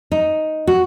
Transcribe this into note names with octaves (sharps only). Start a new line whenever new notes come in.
D#4
F#4